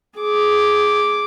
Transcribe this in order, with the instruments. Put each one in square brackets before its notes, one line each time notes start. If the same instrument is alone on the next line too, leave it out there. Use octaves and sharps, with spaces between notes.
[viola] G#4 D6